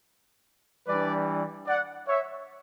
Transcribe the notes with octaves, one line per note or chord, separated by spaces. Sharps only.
E3 G3 D4 B4 D5
D5 F#5
C#5 E5